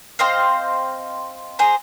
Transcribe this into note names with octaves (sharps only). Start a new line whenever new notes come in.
C4 C5 D#5 F5
G#4 C5 A#5